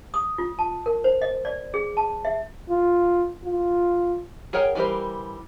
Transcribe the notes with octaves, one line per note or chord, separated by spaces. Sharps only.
D#6
F4
A5
A#4
C5
D#5
D5
G#4
A5
E5
F4
F4
G#4 A#4 C#5 F#5 G5
E3 G3 G4 A#4 C5